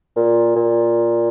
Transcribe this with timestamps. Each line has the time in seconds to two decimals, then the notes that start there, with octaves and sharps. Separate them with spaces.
0.16 A#2
0.56 A#2